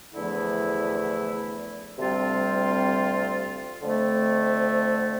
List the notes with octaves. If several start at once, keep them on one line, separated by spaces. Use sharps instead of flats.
E2 D3 F3 A3 E4
D2 C3 G3 C4 F4
F2 D3 A3 C4